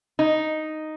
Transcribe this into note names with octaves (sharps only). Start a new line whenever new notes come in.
D#4